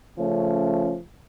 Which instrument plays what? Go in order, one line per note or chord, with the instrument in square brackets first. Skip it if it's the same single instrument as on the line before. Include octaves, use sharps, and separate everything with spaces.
[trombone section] C#3 F3 A3 C#4